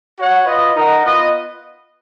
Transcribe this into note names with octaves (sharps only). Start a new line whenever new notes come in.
F#4 C#5 F#5
F4 B4 D#5
D#4 A#4 D#5 F#5
B3 F4 B4 D#5